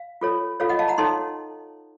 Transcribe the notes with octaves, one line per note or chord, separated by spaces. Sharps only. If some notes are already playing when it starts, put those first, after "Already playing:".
Already playing: F5
F4 A4 C#5
F4 A4 C#5 F5
D#5 F#5
F5 A5
F#5 A#5
D#4 A4 C#5 A5 C6